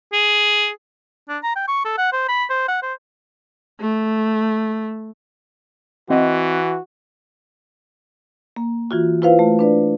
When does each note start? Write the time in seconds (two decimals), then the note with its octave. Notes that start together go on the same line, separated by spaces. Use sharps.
0.13 G#4
1.29 D4
1.43 A#5
1.56 G5
1.68 C#6
1.85 A4
1.98 F#5
2.13 C5
2.29 B5
2.50 C5
2.68 F#5
2.83 C5
3.81 A3
6.10 E3 C4 F#4 D#5 F#5
8.56 A#3
8.91 E3 F4 F#4
9.22 E4 F4 B4 C5 F5
9.39 A3
9.59 D4 B4 D5